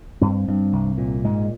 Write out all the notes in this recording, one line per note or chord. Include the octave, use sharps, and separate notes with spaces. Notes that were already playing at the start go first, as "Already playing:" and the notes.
G2 C4
G2
C2
A#2
G#2 G#3